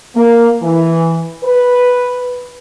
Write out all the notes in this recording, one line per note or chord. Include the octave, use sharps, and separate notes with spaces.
A#3
E3
B4